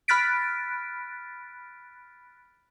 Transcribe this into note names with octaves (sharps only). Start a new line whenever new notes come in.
B5 F6 F#6 A6 B6 D7